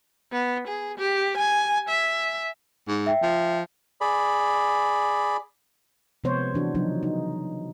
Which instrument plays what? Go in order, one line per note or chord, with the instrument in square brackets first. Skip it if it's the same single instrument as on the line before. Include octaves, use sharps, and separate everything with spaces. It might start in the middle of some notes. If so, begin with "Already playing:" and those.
[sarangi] B3
G#4
G4
G#5
E5
[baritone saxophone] G#2
[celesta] E5 G5
[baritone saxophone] F3
[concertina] G#4 D5 B5
[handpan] C3 F3 G#3 B3 C5 C#5
E3 D4 F#4
C#3 F3 F#3 D4 D#4
D#4